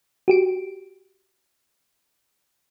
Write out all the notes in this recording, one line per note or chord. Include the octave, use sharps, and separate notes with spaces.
F#4 G4 D7